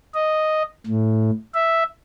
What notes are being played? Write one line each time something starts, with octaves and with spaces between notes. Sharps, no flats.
D#5
A2
E5